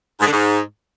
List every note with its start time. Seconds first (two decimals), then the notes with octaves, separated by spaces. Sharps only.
0.20 G#2
0.26 D3
0.32 G#2